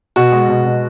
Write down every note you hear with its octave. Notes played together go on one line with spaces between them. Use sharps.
B2 F#4
G#3
B2
B2